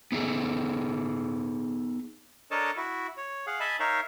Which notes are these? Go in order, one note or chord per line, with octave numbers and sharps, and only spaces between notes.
B3 D#4 F#4 G#4 A4
D4 A4 A#4 C#5 D#5 A5
E4 F#4
C#5
G#4 F5 F#5
D#5 E5 G#5 A5 B5
D#4 A#4 C#5 E5 F5